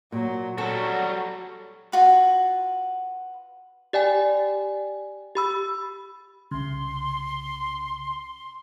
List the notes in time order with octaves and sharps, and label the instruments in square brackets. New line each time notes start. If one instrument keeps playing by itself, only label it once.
[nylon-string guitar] A#2 [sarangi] F#3
[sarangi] F#3 [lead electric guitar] G3 F#4 [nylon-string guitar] C4 [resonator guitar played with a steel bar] A4
[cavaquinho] F4 F#4 B4
[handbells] G4 D5 G5 G#5
G4 B5 E6
[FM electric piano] C2 C#3 [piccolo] C6